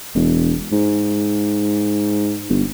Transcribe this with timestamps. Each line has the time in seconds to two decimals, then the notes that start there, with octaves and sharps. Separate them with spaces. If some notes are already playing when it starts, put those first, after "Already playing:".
0.15 E1
0.72 G#2
2.49 G1